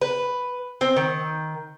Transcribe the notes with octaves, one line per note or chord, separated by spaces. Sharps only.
B4
C4
D#3